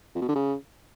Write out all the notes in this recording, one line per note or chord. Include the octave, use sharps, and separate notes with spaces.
F2
B2
D3
C#3